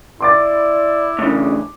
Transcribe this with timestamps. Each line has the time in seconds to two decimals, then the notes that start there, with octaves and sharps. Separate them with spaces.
0.20 E4 D5 C6 D6 A6
1.19 A2 C#3 E3 D4